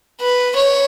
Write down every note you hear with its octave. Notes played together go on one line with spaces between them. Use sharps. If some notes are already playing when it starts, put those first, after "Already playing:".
B4
C#5